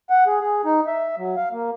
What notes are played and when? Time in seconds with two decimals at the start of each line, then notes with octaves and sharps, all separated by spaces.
0.10 F#5
0.27 G#4
0.41 G#4
0.65 D#4
0.87 E5
1.18 F#3
1.36 F5
1.52 A#3